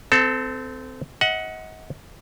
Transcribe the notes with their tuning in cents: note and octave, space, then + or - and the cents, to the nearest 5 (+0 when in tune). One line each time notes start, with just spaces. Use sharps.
C4 -25 A4 +0
D#5 +35 F#5 +0